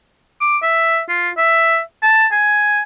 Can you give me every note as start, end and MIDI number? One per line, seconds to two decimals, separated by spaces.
0.41 0.57 86
0.62 1.01 76
1.09 1.30 65
1.37 1.80 76
2.03 2.26 81
2.32 2.82 80